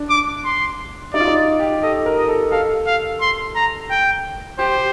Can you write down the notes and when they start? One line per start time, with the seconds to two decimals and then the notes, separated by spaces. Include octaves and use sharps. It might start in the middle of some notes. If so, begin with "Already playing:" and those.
Already playing: D4
0.10 D6
0.45 C6
1.14 D#4 D5
1.20 F4
1.28 D#4
1.60 G4
1.83 A4 D#5
2.06 A#4
2.18 D#5
2.28 A4
2.51 A4 F5
2.86 F5
3.21 C6
3.55 A#5
3.90 G5
4.59 G4 C5